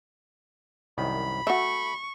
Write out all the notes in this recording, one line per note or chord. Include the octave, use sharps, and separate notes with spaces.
C2 F#2 D#3 B5
A3 F#4 E5 C#6